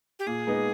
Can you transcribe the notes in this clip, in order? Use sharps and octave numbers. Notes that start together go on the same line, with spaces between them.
G4
A#2 G#4
G#3 B3 D#4